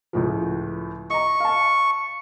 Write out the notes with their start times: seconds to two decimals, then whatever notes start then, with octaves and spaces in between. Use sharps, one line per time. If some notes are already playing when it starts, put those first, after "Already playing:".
0.13 C#2 A2 F3
1.10 D#5 A#5 C#6
1.40 F5 A5